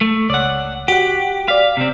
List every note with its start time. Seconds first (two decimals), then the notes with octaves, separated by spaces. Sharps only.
0.01 A3
0.30 C#2 D5 F#5
0.88 F#4 G4 F#5
1.48 D5 F5 B6
1.77 C3 C4